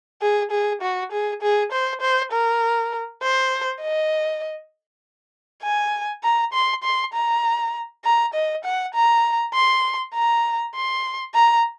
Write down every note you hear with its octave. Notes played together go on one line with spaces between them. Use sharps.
G#4
G#4
F#4
G#4
G#4
C5
C5
A#4
C5
D#5
G#5
A#5
C6
C6
A#5
A#5
D#5
F#5
A#5
C6
A#5
C6
A#5